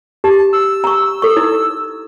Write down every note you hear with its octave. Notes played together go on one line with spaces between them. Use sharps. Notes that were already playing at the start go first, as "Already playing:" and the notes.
G4 A5
E6
A#5 C#6
A4 C#6
D#4 E4